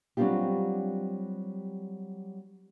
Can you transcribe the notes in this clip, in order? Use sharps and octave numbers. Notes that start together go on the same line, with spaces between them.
F#3 G3 C4 D4 F4 G4